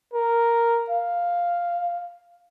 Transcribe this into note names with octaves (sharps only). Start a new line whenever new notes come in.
A#4
F5